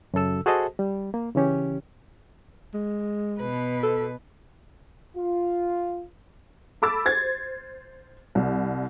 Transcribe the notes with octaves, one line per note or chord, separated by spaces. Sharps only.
F#2 C#3 A4 E6
F#4 G#4 A4 C5 D#5 A5
G3
A#3
C#3 E3 C#4 G4
G#3
B2 B4
A4
F4
A4 B5 D6 E6 A6
C5 G#6 A6
C2